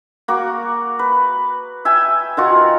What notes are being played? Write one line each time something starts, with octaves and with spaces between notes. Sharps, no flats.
A#3 F#4 D6
B4
E5 G5 G#5
D#3 F4 F#4